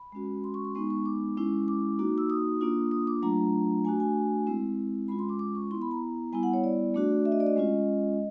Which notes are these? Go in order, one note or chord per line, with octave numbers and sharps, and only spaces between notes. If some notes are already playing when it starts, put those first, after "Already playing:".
Already playing: B5
G#3 C#4 F#4
C6
C#6
C6
G#3 B3 D#4 C#6
C#6
D6
G#3 C#4 E4
D6
A#3 D#4 F#4
E6
D#6
A#3 D4 F4
D#6
D6
F#3 A3 D4 F4 A#5
A3 D4 F#4 G#5
G#5
G#3 C4 E4
G#3 C#4 F4 B5
C6
D6
D6
C#6
B3 E4 C6
B5
A#5
G3 B3 E4 G#5
F#5
C#5
D5
A3 D4 F#4
E5
D#5
D5
D#5
G#3 C#4 F4